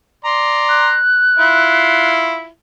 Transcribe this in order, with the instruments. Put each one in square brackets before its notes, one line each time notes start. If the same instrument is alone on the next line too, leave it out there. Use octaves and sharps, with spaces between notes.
[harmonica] D5 A#5 C6
[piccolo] F#6
[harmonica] E4 F4